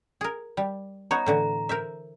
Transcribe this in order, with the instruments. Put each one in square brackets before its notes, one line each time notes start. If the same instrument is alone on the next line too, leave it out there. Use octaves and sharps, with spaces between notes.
[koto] G#4 A#4
G3
[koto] B3 D#4 C#5 [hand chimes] A#5
[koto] A2 D3 E3
A#4 C5 E5